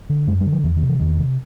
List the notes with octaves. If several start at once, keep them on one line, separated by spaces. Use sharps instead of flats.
D3
F#2 G#3
G3
D3
F3
E2 E3
D#3
C3
E3
E2 D#3
C3